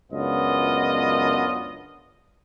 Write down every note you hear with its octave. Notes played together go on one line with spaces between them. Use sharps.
C#2 F#2 B3 D4 F4 D#5